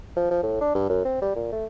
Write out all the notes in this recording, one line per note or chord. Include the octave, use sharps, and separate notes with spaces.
F3
F3
A2
D4
G2
F#2
C4
G3
A#2
A3